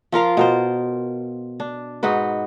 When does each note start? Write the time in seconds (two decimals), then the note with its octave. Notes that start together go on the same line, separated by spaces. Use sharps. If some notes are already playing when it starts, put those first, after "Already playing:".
0.12 F3 F4 A#4 F5
0.37 B2 A#4 C5
1.60 D4
2.03 G#2 D#4 F#4 B4